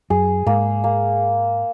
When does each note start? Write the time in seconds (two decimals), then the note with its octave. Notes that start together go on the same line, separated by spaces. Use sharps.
0.10 F#2 G#4
0.46 G#2 A#3
0.84 A#3